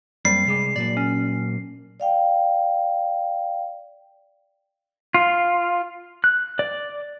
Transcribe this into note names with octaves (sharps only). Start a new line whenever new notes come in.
F#2 G3 A#3 C4 C7
C2 G#3 D5
A#2 F#3 A#3 D5
C#4
D5 F5 G5
F4
F#6
D5